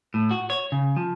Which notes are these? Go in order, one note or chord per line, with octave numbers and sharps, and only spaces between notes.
A2
F#4
C#5
C#3
F3